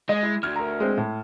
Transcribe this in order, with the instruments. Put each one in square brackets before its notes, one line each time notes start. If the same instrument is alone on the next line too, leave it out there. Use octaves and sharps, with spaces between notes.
[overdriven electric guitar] G#3 [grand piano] D#5
[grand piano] E4
[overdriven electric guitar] D2 [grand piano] F6 G#6
[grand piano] A#4 A#5
G#3 C4
A2